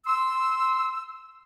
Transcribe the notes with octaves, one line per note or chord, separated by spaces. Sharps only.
C6 E6